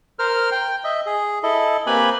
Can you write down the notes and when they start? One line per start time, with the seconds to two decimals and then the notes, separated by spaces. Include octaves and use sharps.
0.19 A#4 C5 F6
0.52 G5
0.84 D#5 E5
1.06 G#4
1.43 E4 A4 D#5
1.87 A#3 C4 G4 B4 G#5 B5